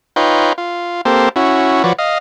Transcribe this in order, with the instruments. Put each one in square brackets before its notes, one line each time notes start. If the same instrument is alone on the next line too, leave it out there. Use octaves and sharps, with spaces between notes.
[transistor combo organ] D#4 F4 B4 C#5 G5 C6
F4
A#3 C4 G4 A4 C5
C#4 E4 F#4
F3 F#4 B4 C#5 D5
D#5 F5